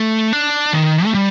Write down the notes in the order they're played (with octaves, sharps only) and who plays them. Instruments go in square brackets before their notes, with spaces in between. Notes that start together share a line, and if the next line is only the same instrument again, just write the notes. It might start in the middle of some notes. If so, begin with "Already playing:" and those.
Already playing: [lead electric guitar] A3
D4
D#3
A3
G3